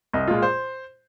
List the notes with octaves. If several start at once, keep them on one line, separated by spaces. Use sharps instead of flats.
C2 D#5
A#2 G#3 F4
C5